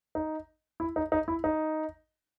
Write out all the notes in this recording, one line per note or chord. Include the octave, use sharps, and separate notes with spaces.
D#4
E4
D#4
D#4
E4
D#4